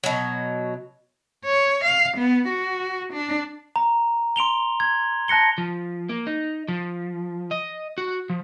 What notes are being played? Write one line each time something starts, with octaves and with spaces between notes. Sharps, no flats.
B2 F#3
C#5
F5
B3
F#4
D4
A#5
C6 D7 F7 G7
G#6
A5 F#6 A#6 C#7 G7
F3
A#3
D#4
F3
D#5
F#4
F3